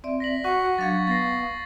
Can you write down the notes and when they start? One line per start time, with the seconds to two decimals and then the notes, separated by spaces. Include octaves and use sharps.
0.04 C4 D5 E5
0.20 A#6 B6 F#7
0.44 F#4 F#5 C#6 B6
0.78 F#3 D4 F5 G#6 A6
1.07 B3 F5 A6 A#6 C7